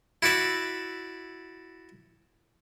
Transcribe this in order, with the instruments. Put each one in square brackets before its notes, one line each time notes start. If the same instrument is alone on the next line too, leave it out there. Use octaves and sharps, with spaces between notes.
[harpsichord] E4 F#4 D5 E5